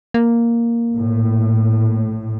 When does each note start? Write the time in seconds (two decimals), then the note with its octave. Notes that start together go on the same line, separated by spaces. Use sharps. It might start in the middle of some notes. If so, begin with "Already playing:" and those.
0.14 A#3
0.91 A#1 A2